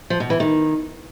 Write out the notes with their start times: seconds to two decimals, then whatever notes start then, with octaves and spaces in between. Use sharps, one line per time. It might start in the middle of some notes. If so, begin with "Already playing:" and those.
0.10 F3
0.20 B2
0.30 E3
0.40 D#3